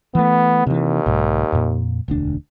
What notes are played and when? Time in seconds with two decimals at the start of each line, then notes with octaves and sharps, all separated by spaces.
0.15 E3 A3 B3
0.67 D#2 C3 E3
1.06 B1 G#2
1.52 F2 A#2
2.08 E1 D2 D4